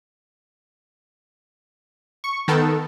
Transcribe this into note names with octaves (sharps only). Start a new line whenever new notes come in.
C#6
D#3 B3 A4